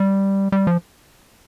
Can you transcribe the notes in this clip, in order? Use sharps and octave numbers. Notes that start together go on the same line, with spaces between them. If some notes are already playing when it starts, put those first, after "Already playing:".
Already playing: G3
G3
F3